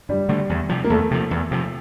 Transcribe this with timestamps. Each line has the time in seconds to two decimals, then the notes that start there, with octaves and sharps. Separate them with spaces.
0.09 G2 G3
0.29 D3 A3
0.49 E2
0.69 C3 F3
0.84 A#3
0.90 E2 A3
1.11 C3 F3
1.31 E2
1.51 C3 F3